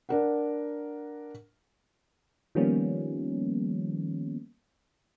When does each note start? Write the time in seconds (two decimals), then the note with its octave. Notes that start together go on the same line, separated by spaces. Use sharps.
0.09 D4 A#4 F#5
2.55 D#3 F3 G3 A#3 B3 C#4